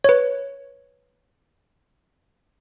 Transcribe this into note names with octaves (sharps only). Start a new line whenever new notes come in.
B4 C#5